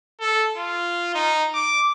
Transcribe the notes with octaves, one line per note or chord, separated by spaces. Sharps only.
A4
F4
D#4
D6